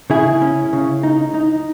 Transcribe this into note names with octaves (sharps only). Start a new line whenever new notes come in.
C#3 E4 G#4
C#4
C#3
D#4
D#4